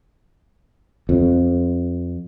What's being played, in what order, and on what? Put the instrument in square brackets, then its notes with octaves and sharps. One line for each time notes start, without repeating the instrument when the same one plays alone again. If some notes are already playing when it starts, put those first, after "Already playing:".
[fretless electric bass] F2